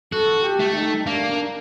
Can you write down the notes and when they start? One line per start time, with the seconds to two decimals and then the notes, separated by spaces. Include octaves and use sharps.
0.12 F#4 A4
0.44 G4
0.59 A3
0.76 D#4
1.07 A#3 D4